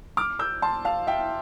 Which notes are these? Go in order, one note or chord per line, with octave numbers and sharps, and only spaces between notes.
D6 F6
E6 G6
A5 C6
F5 A5
E5 G5